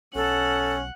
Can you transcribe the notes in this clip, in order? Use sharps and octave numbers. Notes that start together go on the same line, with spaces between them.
B1 C#4 A4 F#5